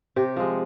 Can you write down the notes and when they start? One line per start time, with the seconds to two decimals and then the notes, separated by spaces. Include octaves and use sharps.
0.16 C3 G4
0.36 F3 G#3